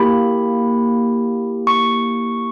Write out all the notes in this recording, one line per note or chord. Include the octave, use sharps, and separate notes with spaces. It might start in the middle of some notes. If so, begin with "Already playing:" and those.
Already playing: A#3 E4 G4 B5
C#6